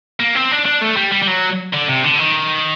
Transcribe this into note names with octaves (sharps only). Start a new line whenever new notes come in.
A#3
C4
D4
D4
A3
G3
G3
G3
F#3
D3
C3
D3
D#3